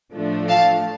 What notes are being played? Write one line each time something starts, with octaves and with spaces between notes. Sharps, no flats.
A2 F3 A3 D4
F5 A5